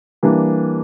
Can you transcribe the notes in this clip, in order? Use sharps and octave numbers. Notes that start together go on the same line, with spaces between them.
E3 G3 A#3 D4